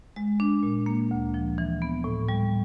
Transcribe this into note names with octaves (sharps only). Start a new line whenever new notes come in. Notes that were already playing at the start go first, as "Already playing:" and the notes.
G#3
D4
A#2
A#3
D2
F3
E3
B3
A2
G3